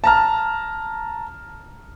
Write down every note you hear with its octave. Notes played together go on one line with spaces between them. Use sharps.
A5 A#5 F6